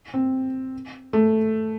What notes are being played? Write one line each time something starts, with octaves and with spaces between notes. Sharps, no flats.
C4
A3